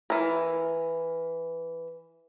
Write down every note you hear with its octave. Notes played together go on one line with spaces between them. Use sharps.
E3 A#4